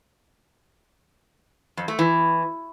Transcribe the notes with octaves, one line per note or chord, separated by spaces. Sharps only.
F2
A3
E3